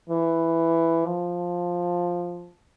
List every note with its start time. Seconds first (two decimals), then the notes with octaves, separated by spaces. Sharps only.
0.09 E3
1.05 F3